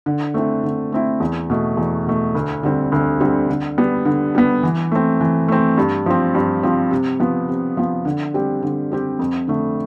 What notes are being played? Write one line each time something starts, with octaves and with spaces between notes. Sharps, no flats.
D3
A3 C4 E4
D3
A3 C4 E4
E2
B2 A3
E2
B2 A3
D2
D3 G3 C4
D2
D3 G3 C4
D3
G3 B3
D3
G3 B3
E3
A3 C4
E3
A3 C4
G2
F3 C4
G2
F3 C4
C3
F3 B3
C3
F3 B3
D3
G3 C4 G4
D3
G3 C4 G4
F2
D3 A3